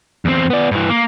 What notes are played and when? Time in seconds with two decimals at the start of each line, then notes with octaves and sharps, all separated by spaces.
0.25 E2 C4
0.50 B3 D5
0.71 G2 E3
0.90 A#3